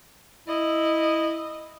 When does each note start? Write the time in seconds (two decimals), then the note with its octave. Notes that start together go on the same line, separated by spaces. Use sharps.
0.48 E4 D#5